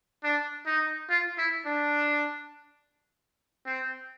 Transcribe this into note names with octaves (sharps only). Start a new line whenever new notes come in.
D4
D#4
F4
E4
D4
C4